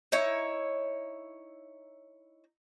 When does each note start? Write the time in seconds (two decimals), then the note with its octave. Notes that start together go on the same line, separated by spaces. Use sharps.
0.12 D#4 E4 C#5